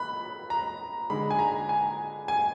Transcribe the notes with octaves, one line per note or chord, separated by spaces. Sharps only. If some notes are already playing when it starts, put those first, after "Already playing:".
Already playing: B5 F#6
A#5
D3 G#3 D#4 B5
G#5
A#5
G#5
G#5